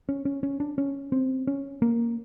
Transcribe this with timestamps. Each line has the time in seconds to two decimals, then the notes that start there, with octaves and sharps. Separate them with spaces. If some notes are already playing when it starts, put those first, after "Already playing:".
0.09 C#4
0.25 C#4
0.43 C#4
0.60 D4
0.78 C#4
1.12 C4
1.47 C#4
1.82 A#3